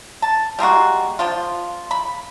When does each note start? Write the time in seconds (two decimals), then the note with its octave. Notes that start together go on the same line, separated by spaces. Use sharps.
0.22 A5
0.59 G3 G#3 A#3 F#4
1.19 F3 D4 F4
1.91 B5